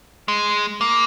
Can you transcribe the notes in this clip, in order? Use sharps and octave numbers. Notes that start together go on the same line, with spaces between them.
G#3
A#3